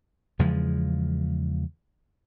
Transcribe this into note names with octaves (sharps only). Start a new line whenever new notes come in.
E2 C#3 F3 G#3